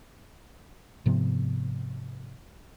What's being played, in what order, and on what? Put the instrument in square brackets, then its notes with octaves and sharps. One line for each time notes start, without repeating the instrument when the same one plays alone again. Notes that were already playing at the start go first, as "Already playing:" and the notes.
[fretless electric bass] G#2 C3 F3 B3